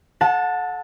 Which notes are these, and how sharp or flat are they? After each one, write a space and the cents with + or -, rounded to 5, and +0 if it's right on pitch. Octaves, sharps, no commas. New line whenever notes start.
A4 -30 F#5 -25 A5 +10